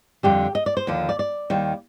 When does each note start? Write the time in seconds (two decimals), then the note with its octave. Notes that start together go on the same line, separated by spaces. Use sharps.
0.23 F2 D3 G3 G4
0.55 D#5
0.66 D5
0.77 C5
0.87 D#2 D3 F3
1.09 D5
1.19 D5
1.50 D#2 D#3 G3